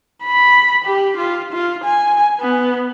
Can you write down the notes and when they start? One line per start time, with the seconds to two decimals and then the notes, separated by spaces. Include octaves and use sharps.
0.25 B5
0.85 G4
1.17 F4
1.53 F4
1.85 G#5
2.40 B3